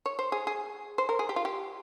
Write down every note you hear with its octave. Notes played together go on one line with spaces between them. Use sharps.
C#5
C5
G#4
G#4
C5
A#4
G#4
G4
F4
G4